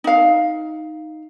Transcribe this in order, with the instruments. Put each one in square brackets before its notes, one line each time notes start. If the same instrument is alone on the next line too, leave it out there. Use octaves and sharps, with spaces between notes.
[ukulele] D#4 F5